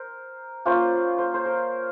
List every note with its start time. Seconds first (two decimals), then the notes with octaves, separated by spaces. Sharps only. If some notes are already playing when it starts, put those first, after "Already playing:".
Already playing: A#4 C5
0.66 A#3 C#4 F4 C5
1.18 C5
1.34 C5
1.46 A#4